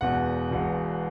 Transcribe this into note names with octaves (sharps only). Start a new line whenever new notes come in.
E1 E2 B2 F#5
E1 E2 B2